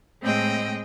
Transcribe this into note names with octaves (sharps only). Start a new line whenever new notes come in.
A2 G#3 C4 D#5 G5